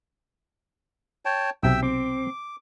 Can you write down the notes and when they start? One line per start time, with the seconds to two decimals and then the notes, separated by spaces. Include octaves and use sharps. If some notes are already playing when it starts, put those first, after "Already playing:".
1.25 C#5 G5 A5
1.63 B1 C3 E5 G5 E6
1.83 C4 D6